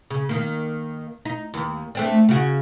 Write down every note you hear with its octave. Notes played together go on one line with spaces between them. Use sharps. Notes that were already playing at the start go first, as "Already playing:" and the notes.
C#3
D#3 A#3
D#4
D#2
A3 C4 D4
C#3 F#4